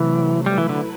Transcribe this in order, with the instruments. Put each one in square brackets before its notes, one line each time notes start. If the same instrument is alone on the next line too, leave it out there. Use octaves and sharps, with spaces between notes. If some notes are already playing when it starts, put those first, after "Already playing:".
Already playing: [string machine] C3 F#3 A3 [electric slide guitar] E3
[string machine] F#3 A3 E4 B4 [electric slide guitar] G3
[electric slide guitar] E3
D3